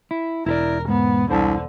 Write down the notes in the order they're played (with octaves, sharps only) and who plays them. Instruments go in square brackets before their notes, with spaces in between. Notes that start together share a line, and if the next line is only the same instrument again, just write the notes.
[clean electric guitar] E4
[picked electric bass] E1 [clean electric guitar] E4 B4 D5 [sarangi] A#4
[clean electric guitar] G#2 [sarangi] B3
[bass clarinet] C2 [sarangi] D3 [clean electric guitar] C5 A5